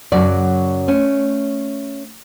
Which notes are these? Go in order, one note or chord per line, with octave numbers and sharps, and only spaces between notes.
F#2 C#3 F#3 D5
A3 C#4